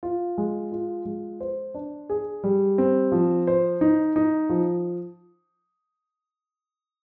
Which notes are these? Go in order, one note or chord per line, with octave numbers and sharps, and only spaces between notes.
F4
G#3
F4
G#3
C5
D4
G#4
G3
C4
F3
C5
D#4
D#4
F3